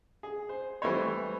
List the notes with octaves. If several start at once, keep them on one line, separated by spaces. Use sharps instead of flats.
G#4
C5
E3 G3 A3 C4 C5 C#5